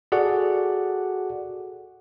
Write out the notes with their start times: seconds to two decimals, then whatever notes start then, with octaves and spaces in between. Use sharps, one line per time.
0.12 F#4 G#4 A4 D5 F#5